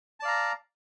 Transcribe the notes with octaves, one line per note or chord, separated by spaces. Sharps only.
D5 F5 A5 A#5